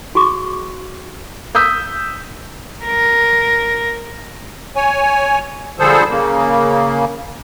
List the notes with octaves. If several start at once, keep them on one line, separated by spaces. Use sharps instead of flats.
F#4 G#4 C#6 D6
D#6 E6 G6 B6
A#4
C#5 G#5
D3 F3 G3 G#4 A4 C5
C#3 A#3